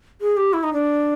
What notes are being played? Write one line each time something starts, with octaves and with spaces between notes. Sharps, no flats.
G#4
G4
E4
D#4
D4